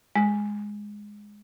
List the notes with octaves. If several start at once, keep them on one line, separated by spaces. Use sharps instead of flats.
G#3